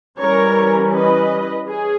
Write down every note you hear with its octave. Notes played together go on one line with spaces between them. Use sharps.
E3 G3 C#4 A#4 C#5
B4 D#5
C#4 G#4